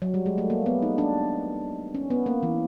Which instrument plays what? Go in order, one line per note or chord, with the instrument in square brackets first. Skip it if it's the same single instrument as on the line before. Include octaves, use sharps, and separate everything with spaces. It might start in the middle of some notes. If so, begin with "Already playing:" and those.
[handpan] F#3
G3
G#3
A3
A#3
B3
D#4
D4
C#4
B3
A#3
E3